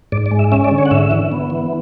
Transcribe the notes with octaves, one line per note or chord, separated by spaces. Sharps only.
G#2 D5
D5
G#3
E5
C#4 E5
D5
D3
C#5
F#5
G#2 E5
E3
B3
E3